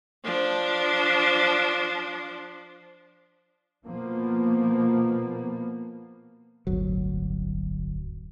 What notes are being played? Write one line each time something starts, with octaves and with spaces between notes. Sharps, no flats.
F3 D4
B2 F3 A#3 B3
D1 G1 F#3